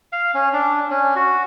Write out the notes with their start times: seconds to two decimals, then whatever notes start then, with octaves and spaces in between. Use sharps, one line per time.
0.12 F5
0.34 C#4
0.53 D4
0.91 C#4
1.16 F#4